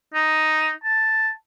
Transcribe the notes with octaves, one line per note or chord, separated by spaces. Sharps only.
D#4
A5